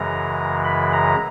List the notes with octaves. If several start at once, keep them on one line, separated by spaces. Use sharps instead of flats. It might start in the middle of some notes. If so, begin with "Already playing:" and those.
Already playing: F#2 C#3 E3 G#3 A#5
B5
A#5